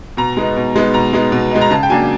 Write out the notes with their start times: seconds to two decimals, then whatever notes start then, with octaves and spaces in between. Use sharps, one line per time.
0.17 B2 A#5
0.37 G#3 B3 D#4
0.57 B2
0.76 G#3 B3 D#4
0.94 B2 A#5
1.13 G#3 B3 D#4
1.32 B2
1.51 G#3 B3 D#4
1.61 A#5
1.71 C#3 A5
1.83 G5
1.89 F#3 A#3 D4 G#5